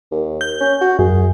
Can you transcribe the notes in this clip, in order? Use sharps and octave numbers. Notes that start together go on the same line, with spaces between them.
D#2
G6
C#4
F#4
F#2 G#4